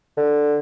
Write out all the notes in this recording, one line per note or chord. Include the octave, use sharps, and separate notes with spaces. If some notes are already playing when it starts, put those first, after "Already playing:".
D3